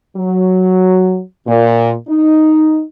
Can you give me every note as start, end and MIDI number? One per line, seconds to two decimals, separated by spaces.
0.17 1.20 54
1.48 1.93 46
2.08 2.82 63